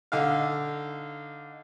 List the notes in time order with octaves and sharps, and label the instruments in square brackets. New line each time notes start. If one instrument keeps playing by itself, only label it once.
[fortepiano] D3 D#4 F5